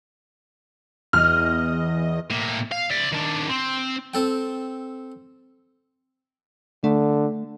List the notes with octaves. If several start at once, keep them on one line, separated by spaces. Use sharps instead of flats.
E2 D#5 F6
A2 A#3
F5
D5 E5
D#3 D4
C4
C4 A4 G5
D3 A3